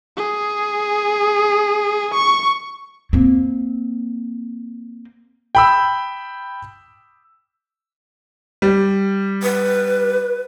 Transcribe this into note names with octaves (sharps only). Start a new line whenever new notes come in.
G#4
C#6
A#3 C4
G5 B5 E6
G3
B4